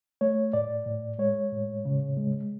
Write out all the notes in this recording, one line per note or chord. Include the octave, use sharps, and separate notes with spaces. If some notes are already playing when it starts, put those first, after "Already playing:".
A3 C#5
A2 D5
A2
G#3 C#5
A2
C#3
G#3